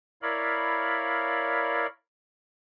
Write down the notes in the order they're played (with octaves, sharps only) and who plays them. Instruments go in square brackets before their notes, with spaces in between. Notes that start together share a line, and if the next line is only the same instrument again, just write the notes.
[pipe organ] E4 A#4 C#5 D5 F5 B5